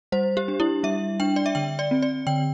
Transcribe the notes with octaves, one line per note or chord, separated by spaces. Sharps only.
G3 C5
G4
D4
E4
G3 E5
D4 G5
D5
E5
D3 G5
D5
C4
D5
D3 G5